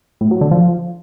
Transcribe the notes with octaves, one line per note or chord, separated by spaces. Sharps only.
A2
F#3
D3
F3